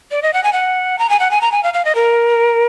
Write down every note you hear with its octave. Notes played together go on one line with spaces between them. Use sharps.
D5
D#5
F#5
G#5
F#5
A#5
G#5
F#5
G#5
A#5
G#5
F5
F5
D#5
A#4